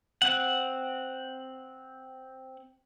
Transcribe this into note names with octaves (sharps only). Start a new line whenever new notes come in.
C4 F#5